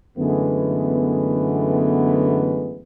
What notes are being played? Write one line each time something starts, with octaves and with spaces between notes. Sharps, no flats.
F#2 D3 E3 G#3 A3 B3